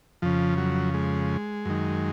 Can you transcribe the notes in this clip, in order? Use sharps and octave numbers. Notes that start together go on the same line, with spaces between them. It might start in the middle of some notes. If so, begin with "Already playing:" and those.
F2 C#3 F3
F#3
G#3
F#2 D#3